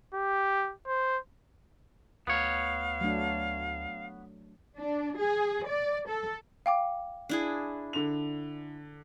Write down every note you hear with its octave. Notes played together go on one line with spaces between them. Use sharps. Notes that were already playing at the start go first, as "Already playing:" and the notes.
G4
C5
D2 B3 C#5 F5
F#3 A3 D4
D4
G#4
D5
A4
F5 G5 D6
D4 E4 G#4
D3 F7